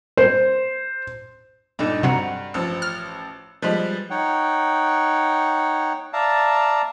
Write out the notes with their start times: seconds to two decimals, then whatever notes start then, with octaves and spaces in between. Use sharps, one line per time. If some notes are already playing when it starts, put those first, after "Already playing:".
0.17 C5
1.79 G2 A#2 D#4 A4
2.03 C3 F#3 F#5 A#5
2.54 A1 F3 E6
2.82 F6
3.62 F3 G3 G#3 B4
4.10 D#4 C#5 F#5 G5
6.13 D5 E5 F5 A5 A#5